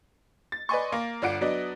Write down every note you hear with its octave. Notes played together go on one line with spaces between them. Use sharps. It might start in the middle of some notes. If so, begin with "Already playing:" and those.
A6
B4 D5 D#5 G#5 C6 C#6
A#3
G1 D4 F4 F#5 D7
F#3 B3 D4 D#5